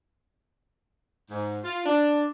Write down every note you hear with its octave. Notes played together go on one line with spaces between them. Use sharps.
G#2
F4
D4